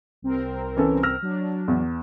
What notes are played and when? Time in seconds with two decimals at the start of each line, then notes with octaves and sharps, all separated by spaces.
0.22 C2 C4 A#4
0.76 E3 C#4 A4
1.03 E6 F6 A#6
1.22 F#3 D4
1.68 E2